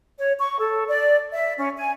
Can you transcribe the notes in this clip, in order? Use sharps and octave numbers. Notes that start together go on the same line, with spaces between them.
C#5
C#6
A4
D5
E5
C#4
G#5